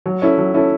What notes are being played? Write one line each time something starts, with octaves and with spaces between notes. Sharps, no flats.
F#3
C#4 E4 A4
F#3
C#4 E4 A4